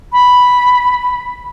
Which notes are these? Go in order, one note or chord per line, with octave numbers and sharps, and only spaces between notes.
B5